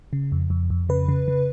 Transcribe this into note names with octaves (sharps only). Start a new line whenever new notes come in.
C#3
F2
F2
F2
C#3 B4
C#3
C#3